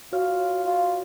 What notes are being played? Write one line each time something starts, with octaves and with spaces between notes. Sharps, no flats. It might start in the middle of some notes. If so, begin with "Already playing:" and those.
F4 F#4 C#5 F6
F4